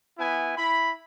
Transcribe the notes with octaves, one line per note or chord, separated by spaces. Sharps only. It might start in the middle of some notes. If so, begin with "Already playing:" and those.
B3 E4 G#5
E4 B5